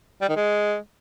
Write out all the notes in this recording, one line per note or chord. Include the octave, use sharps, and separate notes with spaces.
G3
D#3
G#3